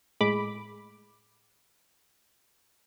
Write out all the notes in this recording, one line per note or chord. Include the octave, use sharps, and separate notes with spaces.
A2 G#3 B5 D6